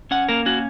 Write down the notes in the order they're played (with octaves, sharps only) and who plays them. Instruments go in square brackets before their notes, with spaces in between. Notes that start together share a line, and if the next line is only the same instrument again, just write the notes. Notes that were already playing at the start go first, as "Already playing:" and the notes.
[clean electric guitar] C#4 F#5
A#3 A#4
C#4 F#4